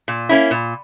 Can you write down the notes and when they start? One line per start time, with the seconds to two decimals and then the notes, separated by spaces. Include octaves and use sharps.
0.08 A#2
0.29 A#3 C#4 E4
0.51 A#2